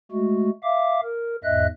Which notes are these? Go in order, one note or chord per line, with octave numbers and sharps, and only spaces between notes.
G#3 A3 F#4
E5 F5 D6
A#4
E2 G#2 D#5 E5 F#6